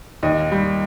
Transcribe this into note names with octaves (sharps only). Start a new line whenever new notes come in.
D#2 D#5
G3